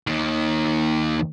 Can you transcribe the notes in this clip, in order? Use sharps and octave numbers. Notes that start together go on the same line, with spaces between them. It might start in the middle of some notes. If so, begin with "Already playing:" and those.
D#2 D#3